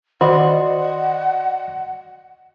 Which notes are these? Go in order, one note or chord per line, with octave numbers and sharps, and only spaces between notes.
D#3 F#4 D5 D#5 F#5 C6